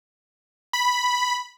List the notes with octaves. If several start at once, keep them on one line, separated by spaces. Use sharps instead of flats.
B5